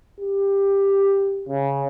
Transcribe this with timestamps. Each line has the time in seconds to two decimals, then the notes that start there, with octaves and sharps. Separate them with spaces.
0.20 G4
1.49 C#3